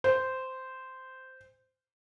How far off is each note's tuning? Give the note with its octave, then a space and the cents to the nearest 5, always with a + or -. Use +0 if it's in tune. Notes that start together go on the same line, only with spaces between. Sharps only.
C5 -10